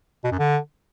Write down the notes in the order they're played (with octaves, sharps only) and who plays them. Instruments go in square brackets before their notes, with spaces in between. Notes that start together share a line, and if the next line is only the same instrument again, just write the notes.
[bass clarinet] B2
F#2
D3